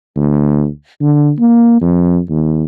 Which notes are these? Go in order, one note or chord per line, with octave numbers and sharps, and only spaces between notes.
D2
D3
A#3
F2
D#2